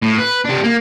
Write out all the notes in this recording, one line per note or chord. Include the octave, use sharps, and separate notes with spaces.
A2
B4
C3 D4
A#3